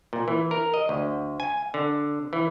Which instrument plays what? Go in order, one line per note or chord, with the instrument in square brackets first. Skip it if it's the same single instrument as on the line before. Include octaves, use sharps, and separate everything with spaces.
[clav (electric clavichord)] A#2
E3
A#4
D#5
D2
G#5
D3
E3